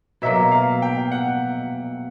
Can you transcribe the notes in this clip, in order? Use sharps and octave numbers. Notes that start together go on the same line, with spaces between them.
B2 F#3 A#3 E5
F5
G5
F#5